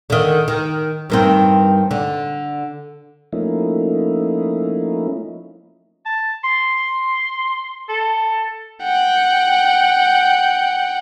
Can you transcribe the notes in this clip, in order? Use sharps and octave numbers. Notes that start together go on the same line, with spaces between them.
D3 D#3
D#3
G2 D#3 C4
D3
F3 A3 A#3 C#4 D#4 E4
A5
C6
A4
F#5 G5